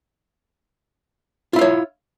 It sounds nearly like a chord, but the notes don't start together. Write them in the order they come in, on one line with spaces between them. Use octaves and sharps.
F4 E4 F5 C#5